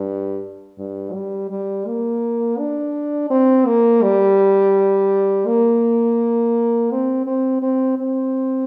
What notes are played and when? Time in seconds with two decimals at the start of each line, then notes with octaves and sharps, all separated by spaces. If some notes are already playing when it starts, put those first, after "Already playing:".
Already playing: G2
0.79 G2
1.14 G3
1.50 G3
1.87 A#3
2.58 D4
3.30 C4
3.66 A#3
4.02 G3
5.46 A#3
6.91 C4
7.26 C4
7.62 C4
7.98 C4